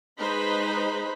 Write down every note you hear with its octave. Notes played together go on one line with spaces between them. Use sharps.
G#3 D#4 B4 C5 B5